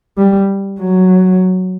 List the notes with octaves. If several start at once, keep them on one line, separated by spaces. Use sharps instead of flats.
G3
F#3